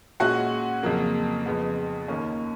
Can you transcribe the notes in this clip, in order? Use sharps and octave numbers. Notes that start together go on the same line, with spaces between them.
A#2 G#3 C#4 F#4 F#5
F2 C#3 F#3 A#3
F2 C#3 G#3 B3
D#2 D#3 A#3 C#4